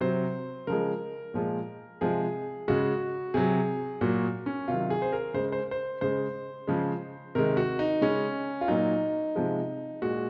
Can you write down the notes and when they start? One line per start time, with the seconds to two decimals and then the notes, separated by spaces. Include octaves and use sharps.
0.01 C3 F#3 C5
0.67 C#3 F3 G#3 A#4
1.34 A#2 F3 G#3
2.01 C3 F3 G#3 G#4
2.68 C#3 G#3 F#4
3.34 C3 F#3 G#4
4.01 A#2 F#3 F#4
4.46 C#4
4.68 C3 D#3 F#3 F4
4.90 G#4
5.02 C5
5.12 A#4
5.34 C#3 G#3 C5
5.52 C5
5.71 C5
6.01 C#3 G#3 C5
6.67 C#3 F3 G#3
7.35 C3 D#3 G#3 A#4
7.57 F#4
7.79 D#4
8.01 C#3 G#3 C#4
8.61 F4
8.68 A#2 F#3 D#4
9.35 C3 F3 G#3
10.02 A#2 G#3 F#4